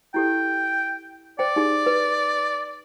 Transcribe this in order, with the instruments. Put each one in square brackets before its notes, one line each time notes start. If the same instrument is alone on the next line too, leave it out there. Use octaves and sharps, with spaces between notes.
[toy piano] E4 G4 A4 [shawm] G5
[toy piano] C5 G5 [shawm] D5
[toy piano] D#4 G4 G#4
B4